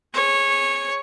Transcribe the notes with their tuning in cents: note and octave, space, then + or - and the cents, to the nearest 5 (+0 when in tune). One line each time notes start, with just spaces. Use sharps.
G#4 -10 C#5 -15